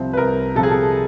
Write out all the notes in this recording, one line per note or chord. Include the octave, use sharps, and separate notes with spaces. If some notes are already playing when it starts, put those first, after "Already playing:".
Already playing: C2 C3 F3 C5
B4
C2 A#4
C3 F3 A4
G#4
A4